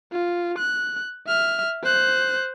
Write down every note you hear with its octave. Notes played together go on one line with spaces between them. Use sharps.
F4
F#6
E5 F6
C5 F#6